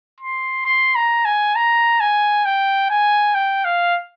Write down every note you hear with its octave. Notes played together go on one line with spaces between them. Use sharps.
C6
C6
A#5
G#5
A#5
G#5
G5
G#5
G5
F5